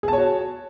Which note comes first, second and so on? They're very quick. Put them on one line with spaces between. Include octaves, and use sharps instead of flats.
G#4 A5 C#5 F#4